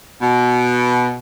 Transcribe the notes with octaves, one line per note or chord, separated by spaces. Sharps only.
B2